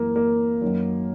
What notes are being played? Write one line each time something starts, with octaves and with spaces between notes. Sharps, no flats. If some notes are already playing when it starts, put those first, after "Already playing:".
Already playing: F#2 E3 A#3
A#3
F#2 D#3 F#3